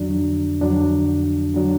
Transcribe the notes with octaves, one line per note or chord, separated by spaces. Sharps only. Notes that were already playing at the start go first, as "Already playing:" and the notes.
Already playing: F2 D3 F#3 D4
F2 D3 F#3 D4
D3 F#3 D4